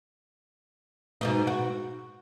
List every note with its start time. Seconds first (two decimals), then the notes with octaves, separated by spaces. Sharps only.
1.21 G#2 B2 D#4
1.47 F#4